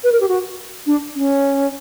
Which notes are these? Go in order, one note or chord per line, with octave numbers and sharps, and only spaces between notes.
B4
A#4
G4
F#4
D4
C#4